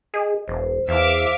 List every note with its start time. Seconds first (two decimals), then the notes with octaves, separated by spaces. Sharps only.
0.14 G#4 D#5
0.48 E1 C5
0.88 E2 E4 C5 E5 F5 D6